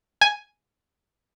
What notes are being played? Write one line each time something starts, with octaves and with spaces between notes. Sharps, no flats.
G#5